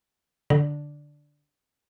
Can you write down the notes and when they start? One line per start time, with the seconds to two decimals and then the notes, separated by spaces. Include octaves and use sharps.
0.50 D3